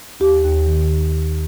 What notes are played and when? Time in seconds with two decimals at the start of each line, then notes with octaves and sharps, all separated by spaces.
0.20 D#2 G4
0.44 D#2
0.66 D#3